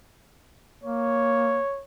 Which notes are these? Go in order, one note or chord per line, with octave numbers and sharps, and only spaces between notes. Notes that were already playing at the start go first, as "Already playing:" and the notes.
A#3 C#5